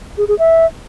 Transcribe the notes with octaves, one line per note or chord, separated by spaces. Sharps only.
G#4
G#4
E5